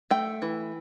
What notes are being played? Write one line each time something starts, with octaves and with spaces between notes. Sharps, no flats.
A3 G5
E3